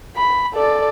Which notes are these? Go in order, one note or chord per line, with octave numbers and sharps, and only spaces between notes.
B5
A4 D5